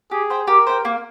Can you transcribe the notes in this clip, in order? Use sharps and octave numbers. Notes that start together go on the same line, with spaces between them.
G4 G#4
C5 G5
G4 A#4
C5 G5
A#3